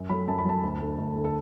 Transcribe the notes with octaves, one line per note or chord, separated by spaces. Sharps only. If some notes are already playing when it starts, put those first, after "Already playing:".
Already playing: F#2
F#3 A3 B5
F#2 A5
B5
F#3 A3 A5
D2
D3 A3
D2
D3 A3
A4